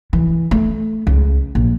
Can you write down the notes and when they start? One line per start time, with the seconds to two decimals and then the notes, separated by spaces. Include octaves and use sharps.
0.13 E3
0.51 A3
1.07 C#2
1.55 A#1